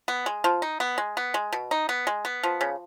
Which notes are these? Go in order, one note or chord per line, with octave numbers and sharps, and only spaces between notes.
B3
G#3
F3
D#4
B3
G#3
B3
G#3
B2
D#4
B3
G#3
B3
F3
C#3